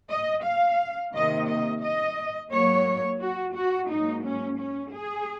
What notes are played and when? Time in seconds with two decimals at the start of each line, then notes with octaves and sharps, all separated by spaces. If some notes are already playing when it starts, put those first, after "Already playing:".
0.09 D#5
0.44 F5
1.13 C3 D#3 A#3 D#5
1.47 D#5
1.82 D#5
2.51 G#2 F#3 A#3 C#5
3.20 F#4
3.55 F#4
3.90 G#2 F#3 A#3 D#4
4.24 C#4
4.59 C#4
4.93 G#4